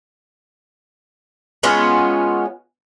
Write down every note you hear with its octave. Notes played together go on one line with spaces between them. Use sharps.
G#3 B3 C#4 F4